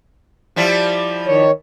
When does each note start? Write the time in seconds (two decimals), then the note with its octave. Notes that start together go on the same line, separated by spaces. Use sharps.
0.56 F3 G3 E4
1.27 D#3 C#5